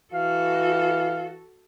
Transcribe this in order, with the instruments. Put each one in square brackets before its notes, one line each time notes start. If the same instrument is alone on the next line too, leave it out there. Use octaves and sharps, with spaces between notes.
[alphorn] E3 [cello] F#4 A4 [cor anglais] F5